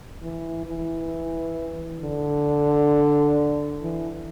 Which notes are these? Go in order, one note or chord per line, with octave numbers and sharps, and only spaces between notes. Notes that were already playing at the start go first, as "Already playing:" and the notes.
E3
E3
D3
E3